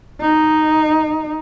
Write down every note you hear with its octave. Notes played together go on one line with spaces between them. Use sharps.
D#4